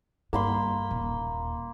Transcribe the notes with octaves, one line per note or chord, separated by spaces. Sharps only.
G2 A#3 B5 C6
D#1